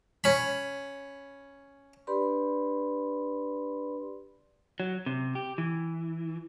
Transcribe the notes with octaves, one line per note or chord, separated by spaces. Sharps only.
C#4 B5
D4 G4 B4 D5 B5 C6
F#3
C3
G4
E3